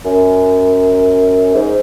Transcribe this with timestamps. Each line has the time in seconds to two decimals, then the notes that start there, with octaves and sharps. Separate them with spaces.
0.05 F#2
1.54 G#2